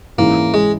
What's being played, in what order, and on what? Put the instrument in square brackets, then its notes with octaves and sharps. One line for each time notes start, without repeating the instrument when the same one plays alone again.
[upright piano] G#2 E3 G#3 C#4 E4 [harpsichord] A#3
[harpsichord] G#3